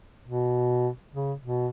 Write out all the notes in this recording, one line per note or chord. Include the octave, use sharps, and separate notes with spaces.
B2
C#3
B2